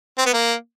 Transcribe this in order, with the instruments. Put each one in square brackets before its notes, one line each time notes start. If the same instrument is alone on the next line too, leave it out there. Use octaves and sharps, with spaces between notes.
[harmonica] C4
B3
A#3